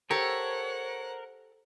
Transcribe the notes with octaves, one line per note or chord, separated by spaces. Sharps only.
G4 A4 A#4 C5 C#5 F#5